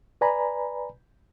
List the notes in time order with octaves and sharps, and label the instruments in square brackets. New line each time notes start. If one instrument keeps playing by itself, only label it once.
[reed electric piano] B4 D5 G#5 A#5 B5